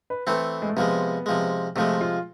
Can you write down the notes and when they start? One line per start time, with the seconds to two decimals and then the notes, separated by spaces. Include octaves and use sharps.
0.10 B4
0.27 E3 A3 C4 A4
0.62 G#3
0.69 A3
0.77 C3 F3 G#3 B3
1.26 C3 F3 G#3
1.76 C3 F3 G#3 A3
2.01 F4